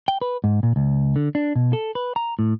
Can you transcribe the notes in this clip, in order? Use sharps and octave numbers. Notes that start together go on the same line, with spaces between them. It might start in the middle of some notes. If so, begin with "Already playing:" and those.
G5
B4
G#2
A#2
C#2
D3
D4
B2
A4
B4
A#5
A2